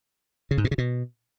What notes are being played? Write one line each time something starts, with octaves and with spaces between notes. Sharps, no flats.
C#3
G#2
A#2
C#3
B2